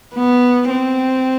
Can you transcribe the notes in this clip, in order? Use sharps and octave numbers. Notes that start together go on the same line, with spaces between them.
B3
C4